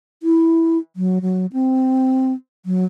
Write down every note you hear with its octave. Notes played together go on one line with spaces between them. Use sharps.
E4
F#3
F#3
C4
F#3